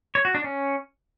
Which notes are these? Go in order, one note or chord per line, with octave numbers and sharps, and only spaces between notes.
C#5
F#4
D4
C#4